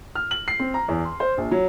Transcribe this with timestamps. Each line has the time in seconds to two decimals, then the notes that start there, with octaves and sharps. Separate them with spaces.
0.15 F6
0.31 F#7
0.48 C7
0.59 C4
0.74 A#5
0.88 E2
1.05 C6
1.20 C5
1.37 A#1
1.51 F#3